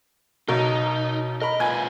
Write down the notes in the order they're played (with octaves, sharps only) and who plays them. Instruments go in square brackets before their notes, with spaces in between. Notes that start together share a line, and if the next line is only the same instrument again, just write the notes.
[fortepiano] B1 B2 A#4 [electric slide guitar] D#4
[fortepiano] A#4 B5 [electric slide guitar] D#5
[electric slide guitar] A#2 F4 B4 [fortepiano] G#5